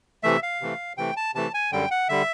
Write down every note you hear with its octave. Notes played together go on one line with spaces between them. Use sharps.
C3 E3 A3 E5
F5
C3 E3 A3
C3 E3 A3 G5
A5
C3 E3 A3 A5
G#5
F#2 D3 G3 G5
F#5
D3 G3 E5